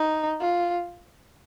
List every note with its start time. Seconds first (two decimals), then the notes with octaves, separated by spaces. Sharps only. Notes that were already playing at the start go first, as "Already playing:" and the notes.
Already playing: D#4
0.40 F4